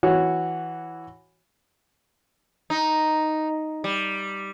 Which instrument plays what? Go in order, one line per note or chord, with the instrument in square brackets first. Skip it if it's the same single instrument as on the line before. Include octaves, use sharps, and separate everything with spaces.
[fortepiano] E3 F#4 C#5
[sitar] D#4
G3